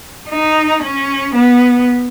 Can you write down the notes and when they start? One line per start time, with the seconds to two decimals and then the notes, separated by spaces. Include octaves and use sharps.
0.30 D#4
0.83 C#4
1.35 B3